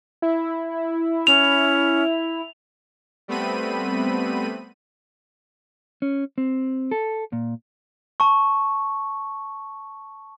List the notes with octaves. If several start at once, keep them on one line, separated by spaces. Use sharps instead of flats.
E4
C#4 F7
G3 A3 B3 C4 B5 D#7
C#4
C4
A4
A#2
A5 C#6